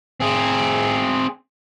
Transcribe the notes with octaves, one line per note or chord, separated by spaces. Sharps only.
C4 G#4